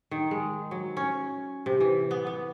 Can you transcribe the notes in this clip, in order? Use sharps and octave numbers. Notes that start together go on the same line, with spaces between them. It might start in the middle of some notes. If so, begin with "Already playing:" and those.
D#3
G#3
F#3
C#4
C3
E3
B3
B3